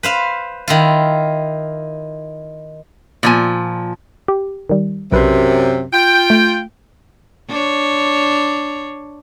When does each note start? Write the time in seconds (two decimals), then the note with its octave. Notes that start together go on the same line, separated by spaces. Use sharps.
0.03 B4 C5 F5
0.68 D#3 E4 F4
3.23 A#2 F3 G#5
4.28 G4
4.69 D#3 G3
5.12 B1 F#2 C3 B4
5.92 F4 G5
6.30 A3
7.49 D4 C#5